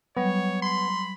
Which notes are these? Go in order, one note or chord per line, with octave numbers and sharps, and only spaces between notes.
F#3 G3 B3 C#5
B5 C6